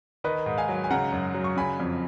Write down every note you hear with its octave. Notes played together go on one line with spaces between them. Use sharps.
D#3 B4 D#5
G#2
F5 G#5
F#3
G#5
C#3 F#5 A#5
F#2
F#3
C#6
C#3 G#5 B5
F2